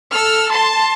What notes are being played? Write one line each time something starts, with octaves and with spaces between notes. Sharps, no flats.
A4 E6 F6
A5 C6